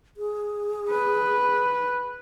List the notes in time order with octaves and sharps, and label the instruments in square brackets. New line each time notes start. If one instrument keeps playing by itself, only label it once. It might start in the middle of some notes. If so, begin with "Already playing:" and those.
[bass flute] G#4
[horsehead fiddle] B4